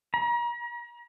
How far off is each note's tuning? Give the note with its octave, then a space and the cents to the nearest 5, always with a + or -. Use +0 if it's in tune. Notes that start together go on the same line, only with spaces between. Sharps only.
A#5 +40